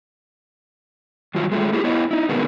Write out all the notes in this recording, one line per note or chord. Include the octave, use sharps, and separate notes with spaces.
G2 D#3 F#3 F4
G#3 A3 F4
A#3 E4 G4 G#4
B3 E4 C#5 D#5
D#4 E4
B2 D3 D#3 G#3 A#3 B3